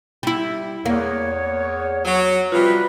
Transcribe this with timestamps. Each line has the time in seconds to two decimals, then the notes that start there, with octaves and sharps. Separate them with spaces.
0.23 G3 E4
0.86 E2 A#3 C#5
2.05 F#3
2.52 C3 F3 G3 F4 F#4 B4